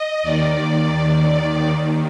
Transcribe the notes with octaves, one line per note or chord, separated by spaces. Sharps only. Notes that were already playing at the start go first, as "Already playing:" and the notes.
Already playing: D#5
D#2 D#3 D5
D#2 D#3